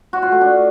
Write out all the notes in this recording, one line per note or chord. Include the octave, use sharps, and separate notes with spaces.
F#4
F4
A3
D4